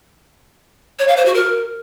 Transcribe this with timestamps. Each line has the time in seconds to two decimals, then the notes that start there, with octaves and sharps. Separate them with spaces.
0.99 C#5
1.08 F5
1.17 C5
1.25 F#4
1.34 A#4